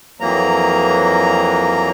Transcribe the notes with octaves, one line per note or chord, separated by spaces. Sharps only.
F2 E3 F#3 A#3 A#5